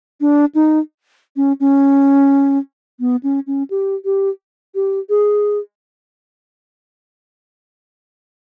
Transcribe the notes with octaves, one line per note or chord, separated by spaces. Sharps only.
D4
D#4
C#4
C#4
B3
C#4
C#4
G4
G4
G4
G#4